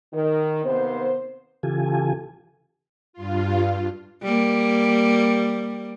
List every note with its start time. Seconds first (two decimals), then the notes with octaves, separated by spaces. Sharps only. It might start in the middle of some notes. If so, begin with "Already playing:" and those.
0.13 D#3
0.64 D#2 C3 B3 C5
1.63 C#3 E3 F4 G4 A4 G#5
3.13 G2 F4
4.23 G3 A#3